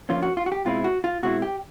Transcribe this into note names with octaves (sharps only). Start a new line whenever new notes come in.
D2 D3 F3 A#3 C#4 F4
F#4
F4
F#4
G4
B2 G#3 C4 E4 F4
F#4
F4
B2 G#3 C4 E4 F#4
G4